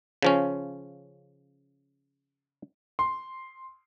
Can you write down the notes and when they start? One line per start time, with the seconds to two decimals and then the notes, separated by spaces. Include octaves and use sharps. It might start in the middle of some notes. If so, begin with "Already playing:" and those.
0.23 C#3 F3 C#4
2.99 C6